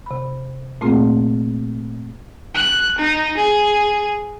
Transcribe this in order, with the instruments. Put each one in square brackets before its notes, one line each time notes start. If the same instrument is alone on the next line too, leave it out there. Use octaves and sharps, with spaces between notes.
[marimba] C3 B5
A#2 A3 A#3 C4 F4 G#4
[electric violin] F#6
D#4
G#4